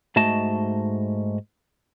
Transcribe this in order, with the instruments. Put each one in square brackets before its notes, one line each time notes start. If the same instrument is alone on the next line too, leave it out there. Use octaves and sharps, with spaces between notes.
[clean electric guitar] G#2 A3 F#4 D#5 A5